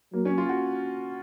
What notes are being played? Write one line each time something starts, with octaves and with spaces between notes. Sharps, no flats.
F#3 A#3
C#4
F4
F#4